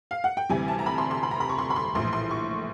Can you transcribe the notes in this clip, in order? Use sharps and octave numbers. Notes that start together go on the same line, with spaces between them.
F5
F#5
G5
D2 C3 E3 G3 G#5
A5
A#5
B5
C6
C6
B5
A#5
B5
C#6
C6
B5
C6
A#1 A2 E3 C6
C6
C#6